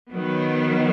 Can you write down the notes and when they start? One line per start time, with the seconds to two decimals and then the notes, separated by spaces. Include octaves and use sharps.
0.12 D#3 F#3 B3